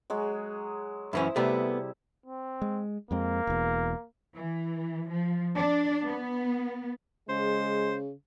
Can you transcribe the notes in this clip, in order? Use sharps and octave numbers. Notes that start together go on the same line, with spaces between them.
F#3 G#3 G#4
F#2 E3 C#4 E4 C5
C3 G3 A3 B3
C4
G#3
F2 G#3 A#3 C4
E1 E2
E3
F3
D4
B3
C#3 G#3 C5